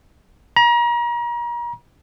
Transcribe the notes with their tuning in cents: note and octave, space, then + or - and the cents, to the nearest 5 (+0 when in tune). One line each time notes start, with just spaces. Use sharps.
A#5 +35